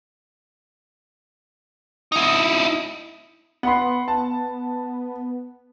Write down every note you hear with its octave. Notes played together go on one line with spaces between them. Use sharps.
D#4 E4
B3 F#5 B5 C6
A5